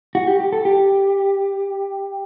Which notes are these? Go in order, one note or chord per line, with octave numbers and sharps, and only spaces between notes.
F#4
G4
G4
A4
G4